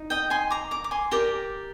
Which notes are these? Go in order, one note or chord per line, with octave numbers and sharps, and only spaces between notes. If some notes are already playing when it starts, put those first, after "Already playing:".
Already playing: D#4
D#5 G5
G#5 C6
A#5 D6
A#5 D6
D6
G#5 C6
G4 A#4 D5 G5 A#5